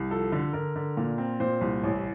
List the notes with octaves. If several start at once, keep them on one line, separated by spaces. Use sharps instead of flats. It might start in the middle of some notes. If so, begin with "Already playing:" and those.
Already playing: C2
F3 A4
D3
D3 A#4
D3
A#2
C4
A#2 C5
C2
A1